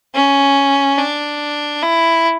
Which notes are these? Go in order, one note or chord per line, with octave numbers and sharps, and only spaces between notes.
C#4
D4
E4